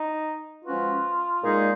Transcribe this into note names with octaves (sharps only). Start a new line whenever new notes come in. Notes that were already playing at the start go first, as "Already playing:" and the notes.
Already playing: D#4
F3 G#3 C#4 F4 F#4 B4
A#2 G#3 D#4 G#4